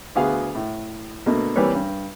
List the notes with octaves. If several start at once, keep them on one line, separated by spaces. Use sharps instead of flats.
D2 B3 F#4 G#4 F5
A2
B2 D3 A3 A#3
E3 G3 A#3 C4 B4 C#5
G2